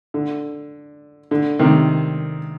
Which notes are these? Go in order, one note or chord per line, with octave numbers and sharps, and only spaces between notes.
D3
D3
C3 D#3